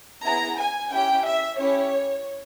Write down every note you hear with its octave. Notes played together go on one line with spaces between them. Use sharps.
B3 E4 G#4 A#5
G#5
C#4 E4 G4 G5
E5
C#4 E4 G4 C#5